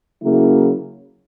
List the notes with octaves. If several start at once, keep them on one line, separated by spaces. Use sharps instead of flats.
C#3 F#3 A#3 E4